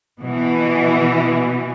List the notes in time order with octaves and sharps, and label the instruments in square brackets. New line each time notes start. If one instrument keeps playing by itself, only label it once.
[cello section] B2 E3